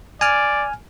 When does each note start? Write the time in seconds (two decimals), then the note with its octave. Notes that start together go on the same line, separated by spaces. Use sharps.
0.21 D5 G#5 F6